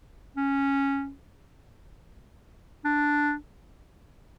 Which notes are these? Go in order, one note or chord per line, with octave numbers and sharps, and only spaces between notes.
C#4
D4